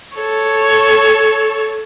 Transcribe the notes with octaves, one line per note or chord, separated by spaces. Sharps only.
A4 C#5